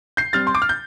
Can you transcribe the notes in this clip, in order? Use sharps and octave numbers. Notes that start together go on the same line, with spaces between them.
G6 C7
G3 C4 F6 A6
C6
D6
F6
G6